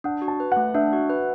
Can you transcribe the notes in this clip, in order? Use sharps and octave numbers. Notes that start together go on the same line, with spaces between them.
D4 F#5
F#4
A5
B4
F#5
A3
D4 E5
F#4
B4